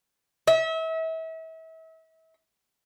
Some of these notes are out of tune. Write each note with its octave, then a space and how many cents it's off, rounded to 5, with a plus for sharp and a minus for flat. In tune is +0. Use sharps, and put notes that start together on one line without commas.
E5 -35